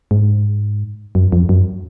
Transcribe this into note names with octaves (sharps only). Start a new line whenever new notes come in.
G#2
F#2
F2
F#2